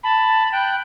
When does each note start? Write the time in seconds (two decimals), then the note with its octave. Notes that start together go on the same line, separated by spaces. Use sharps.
0.03 A5 B5
0.52 G5 F#6